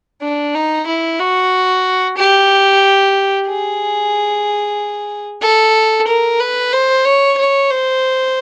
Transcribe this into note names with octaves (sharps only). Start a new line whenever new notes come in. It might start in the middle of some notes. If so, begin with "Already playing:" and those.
D4
D#4
E4
F#4
G4
G#4
A4
A#4
B4
C5
C#5
C#5
C5